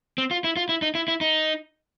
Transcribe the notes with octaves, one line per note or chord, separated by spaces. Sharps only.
C4
F4
E4
F4
E4
D#4
E4
E4
D#4